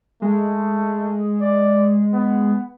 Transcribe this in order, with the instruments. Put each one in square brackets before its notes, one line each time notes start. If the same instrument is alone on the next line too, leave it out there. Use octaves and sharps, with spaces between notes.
[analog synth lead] G#3 [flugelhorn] A3
[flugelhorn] D5
B3